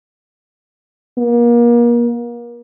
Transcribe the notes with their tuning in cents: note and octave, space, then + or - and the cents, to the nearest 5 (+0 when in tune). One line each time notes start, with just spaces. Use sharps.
A#3 +35